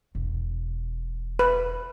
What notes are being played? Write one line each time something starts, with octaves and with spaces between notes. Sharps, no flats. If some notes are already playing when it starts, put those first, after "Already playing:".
E1
B4